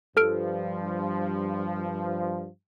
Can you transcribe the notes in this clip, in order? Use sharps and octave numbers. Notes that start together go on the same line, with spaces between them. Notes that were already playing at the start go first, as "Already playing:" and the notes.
G2 F3 A4 F6 D7